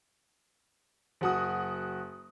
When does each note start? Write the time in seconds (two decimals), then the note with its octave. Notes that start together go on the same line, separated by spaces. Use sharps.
1.21 F#1 F#4 D#6